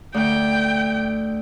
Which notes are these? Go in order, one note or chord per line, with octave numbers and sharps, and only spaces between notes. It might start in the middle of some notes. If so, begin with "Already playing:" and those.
D2 G5